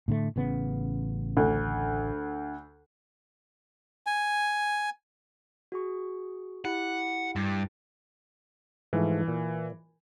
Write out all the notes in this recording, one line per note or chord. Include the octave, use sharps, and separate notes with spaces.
A2 D3 A3
A1 C#3 B3
D2
G#5
F#4 G#4 C#6
E4 G4 F#5
G2
G#2 E3 F3 A3
A#2